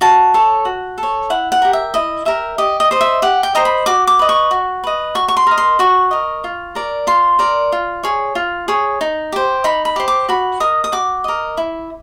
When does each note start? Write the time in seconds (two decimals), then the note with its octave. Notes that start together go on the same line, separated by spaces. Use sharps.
0.01 F#4 A5
0.34 A4 C#5
0.65 F#4
0.98 A4
1.03 C#5
1.30 E4 F#5
1.52 F#5
1.62 G4 A#4
1.73 E5
1.94 E4 D#5
2.25 G4 A#4 E5
2.58 G4 D#5
2.80 D#5
2.91 C5 D#5
3.01 E5
3.22 G4 F#5
3.43 G5
3.55 C5 D#5 A#5
3.65 B5
3.86 F#4 D6
4.07 D6
4.19 B4 D#5
4.29 C#6
4.51 F#4
4.84 B4 D#5
5.15 F#4 C#6
5.28 C#6
5.37 C6
5.47 A#4 D#5
5.58 C6
5.79 F#4 C#6
6.11 A#4 D#5
6.44 F4
6.75 A#4 D5
7.07 F4 C6
7.39 A#4 D5
7.72 F4
8.03 G#4 C#5
8.35 F4
8.68 G#4 C#5
9.01 D#4
9.32 G4 C5
9.64 D#4 B5
9.85 B5
9.96 G4 C5
10.08 D6
10.29 F#4 B5
10.60 A#4 D#5 D#6
10.84 D#6
10.92 F#4 D6
11.24 A#4 D#5
11.57 E4